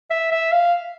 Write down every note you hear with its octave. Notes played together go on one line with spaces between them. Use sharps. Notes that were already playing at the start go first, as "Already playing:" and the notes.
E5
E5
F5